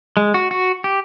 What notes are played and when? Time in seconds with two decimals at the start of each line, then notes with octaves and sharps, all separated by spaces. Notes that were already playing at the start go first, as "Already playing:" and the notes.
0.17 G#3
0.34 F#4
0.51 F#4
0.84 G4